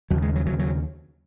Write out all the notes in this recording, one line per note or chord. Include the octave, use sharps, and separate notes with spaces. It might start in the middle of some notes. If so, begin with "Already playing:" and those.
D#2 C#3 F#3
G#3
F#3
D#2 C#3 F#3
F#3